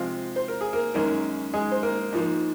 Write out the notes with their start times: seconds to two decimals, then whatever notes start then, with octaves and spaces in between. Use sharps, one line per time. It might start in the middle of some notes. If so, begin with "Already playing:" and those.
Already playing: C3 F3 G#3 C4 F4 F5
0.36 C5
0.48 A#4
0.61 G#4
0.73 A#3 A#4
0.94 F#2 D#3 G#3 A#3 C#4 A#4
1.54 G#3 G#4
1.72 C5
1.83 A#3 A#4
2.13 G#2 F3 A#3